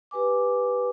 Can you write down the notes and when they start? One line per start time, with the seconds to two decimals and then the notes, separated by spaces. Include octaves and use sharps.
0.11 G4 B4 G#5 D6